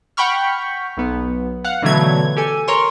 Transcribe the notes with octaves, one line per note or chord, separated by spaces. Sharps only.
F#5 G5 B5 C#6 F6
B1 B3
F5 F#5
B2 D3 E3 F#3 A3 G#6
G4 A4 G#5
A#4 C#5 C6 C#6